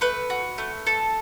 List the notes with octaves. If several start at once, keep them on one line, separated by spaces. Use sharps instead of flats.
A3 B4
F#4
A3
A4